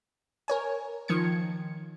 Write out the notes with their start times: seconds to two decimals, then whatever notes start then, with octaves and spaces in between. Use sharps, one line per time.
0.48 A#4 C#5 G#5
1.08 D#3 F3 G#6 C#7